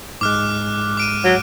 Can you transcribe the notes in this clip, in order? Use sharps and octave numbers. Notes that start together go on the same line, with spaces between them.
G#2 G#3 D6 F6 F#6
D6 D7 D#7
F#3